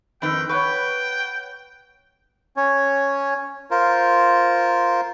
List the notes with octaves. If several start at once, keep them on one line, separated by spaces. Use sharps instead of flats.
F2 D#3 B4 G5
B4 C#5 F#5 G5 C#6
C#4 C#5
F4 A#4 C5